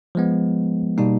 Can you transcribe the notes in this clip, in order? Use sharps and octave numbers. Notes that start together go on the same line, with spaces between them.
F3 G#3 B3
B2 G3 A#3 D#4